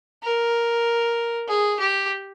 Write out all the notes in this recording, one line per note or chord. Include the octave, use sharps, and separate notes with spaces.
A#4
G#4
G4